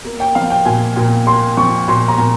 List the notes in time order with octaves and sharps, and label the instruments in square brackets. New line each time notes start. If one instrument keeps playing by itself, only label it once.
[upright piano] A#3
G5
F3 F5
G5
A#2 G#5
A#2
A#3 C6
F3 C#6
A#2 C6
A#5
A#2